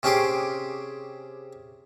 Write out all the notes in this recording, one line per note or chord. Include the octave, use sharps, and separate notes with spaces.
C3 C#4 G4 G#4 C6 D6